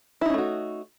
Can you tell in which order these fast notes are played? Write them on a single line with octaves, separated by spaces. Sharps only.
E4 D#4 C#4 A3 F#4